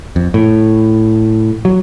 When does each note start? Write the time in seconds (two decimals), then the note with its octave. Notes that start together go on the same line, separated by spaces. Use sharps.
0.16 F2
0.34 A2
1.65 F#3